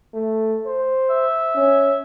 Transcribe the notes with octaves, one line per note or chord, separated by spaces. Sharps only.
A3
C5
E5
C#4